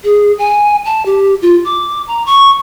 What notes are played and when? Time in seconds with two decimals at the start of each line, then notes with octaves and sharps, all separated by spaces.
0.04 G#4
0.39 G#5
0.85 A5
1.06 G4
1.42 F4
1.65 D6
2.08 A#5
2.26 C#6